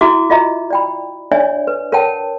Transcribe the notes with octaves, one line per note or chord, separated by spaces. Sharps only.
E4 F#4 E5 D6
F4 D#5 E5 A#5
D5 G5 B5
D4 C#5 D5 E5 G#5
B4
A#4 C#5 F#5 G5 A5